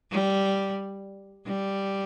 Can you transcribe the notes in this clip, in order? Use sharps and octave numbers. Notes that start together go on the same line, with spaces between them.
G3
G3